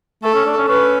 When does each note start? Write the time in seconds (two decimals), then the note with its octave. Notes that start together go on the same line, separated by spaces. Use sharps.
0.23 A3 A4
0.35 C#4
0.46 D4
0.57 C#4
0.68 C#4 B4